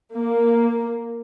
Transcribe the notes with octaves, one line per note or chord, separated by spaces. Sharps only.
A#3